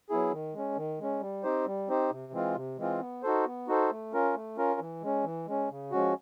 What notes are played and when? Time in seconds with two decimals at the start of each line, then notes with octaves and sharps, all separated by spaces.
0.10 F#3 B3 E4 G#4
0.32 D#3
0.54 G#3 C#4
0.77 D#3
0.99 G#3 C#4
1.21 G3
1.43 C4 D#4 G4 C5
1.66 G3
1.88 C4 D#4 G4 C5
2.11 C3
2.33 E3 G#3 C4 F4
2.55 C3
2.78 E3 G#3 C4 F4
3.00 B3
3.23 D#4 F#4 A4 C5
3.46 B3
3.68 D#4 F#4 A4 C5
3.91 A3
4.13 C#4 F4 A#4
4.35 A3
4.57 C#4 F4 A#4
4.80 E3
5.02 G#3 C#4
5.24 E3
5.47 G#3 C#4
5.70 C#3
5.91 F3 G#3 C#4 F#4